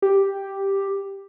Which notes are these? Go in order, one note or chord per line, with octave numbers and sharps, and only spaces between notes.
G4